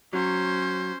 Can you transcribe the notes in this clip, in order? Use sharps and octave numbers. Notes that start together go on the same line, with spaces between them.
F#3 C#4 C5